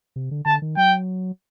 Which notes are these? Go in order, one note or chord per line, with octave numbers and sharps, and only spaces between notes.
C3
D3
D3 A5
D#3
F#3 G5